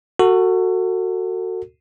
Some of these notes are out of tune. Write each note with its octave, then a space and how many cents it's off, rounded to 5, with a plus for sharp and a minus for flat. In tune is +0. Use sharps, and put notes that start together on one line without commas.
F#4 +0 A4 +35